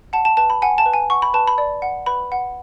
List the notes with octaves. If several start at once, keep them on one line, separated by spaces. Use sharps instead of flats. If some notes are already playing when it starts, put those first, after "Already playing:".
F#5 A5
A5
B4 A5
B5
F#5 G#5
A5
B4
G#5
F#5 C#6
B5
B4 A5
B5
D5
F#5
B4 B5
F#5